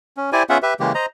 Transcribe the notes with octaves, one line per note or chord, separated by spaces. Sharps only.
C#4
E4 G4 C5 D5 G#5
B3 C#4 F4 G#4 E5 F#5
G4 B4 E5
C#3 E3 G#3 A#3 G4
C5 D#5 A#5